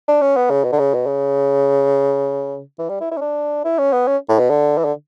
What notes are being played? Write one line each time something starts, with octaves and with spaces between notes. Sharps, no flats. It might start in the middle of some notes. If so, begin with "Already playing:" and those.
D4
C#4
B3
C#3
B2
D3
C#3
B2
C#3
E3
G3
E4
E4
C#4
D4
E4
C#4
B3
C#4
A2
B2
D3
E3
D3